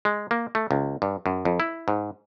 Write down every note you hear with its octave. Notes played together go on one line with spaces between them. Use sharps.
G#3
A#3
A3
C#2
G2
F#2
F2
E4
G#2